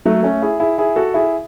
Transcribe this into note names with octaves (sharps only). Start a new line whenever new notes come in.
F#3 A3
A3 C#4
E4 G#4
E4 G#4
E4 G#4
F#4 A4
E4 G#4